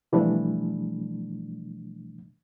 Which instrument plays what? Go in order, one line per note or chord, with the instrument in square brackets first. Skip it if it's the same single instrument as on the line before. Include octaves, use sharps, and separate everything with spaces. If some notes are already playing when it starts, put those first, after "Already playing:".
[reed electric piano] B2 E3 F3 G3 A3 D4